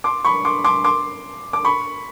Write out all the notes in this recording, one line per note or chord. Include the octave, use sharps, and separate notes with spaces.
C6 D6
B5 C#6
C6 D6
C6 D6
C6 D6
D6
B5 C#6